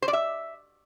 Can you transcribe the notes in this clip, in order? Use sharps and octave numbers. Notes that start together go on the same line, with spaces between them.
C5
D5
E5